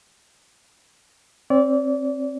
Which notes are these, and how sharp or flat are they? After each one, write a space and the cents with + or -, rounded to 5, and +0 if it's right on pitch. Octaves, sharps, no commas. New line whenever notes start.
C4 +25 D5 -30